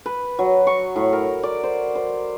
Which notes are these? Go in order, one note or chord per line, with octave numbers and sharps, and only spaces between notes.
B4
F#3
C#6
A2
A#4
D5
C5
C5